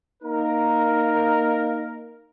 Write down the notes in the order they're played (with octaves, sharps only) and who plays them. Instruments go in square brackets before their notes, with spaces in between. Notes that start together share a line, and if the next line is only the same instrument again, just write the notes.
[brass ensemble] A#3 D#4 A#4